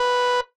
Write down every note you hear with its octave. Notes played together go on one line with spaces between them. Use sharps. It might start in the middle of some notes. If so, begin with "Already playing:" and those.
Already playing: B4